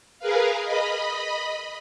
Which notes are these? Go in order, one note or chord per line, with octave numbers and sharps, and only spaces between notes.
G#4 A#4 B4 F5
D#5 B5